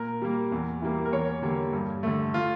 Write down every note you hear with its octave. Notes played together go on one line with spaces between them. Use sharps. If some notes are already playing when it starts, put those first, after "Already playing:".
Already playing: A#2 A#4
G3 A#3
E2
E3 G3 A#3
A#4
E2 C#5
D3 G3 A#3
G2
D3 A3
F4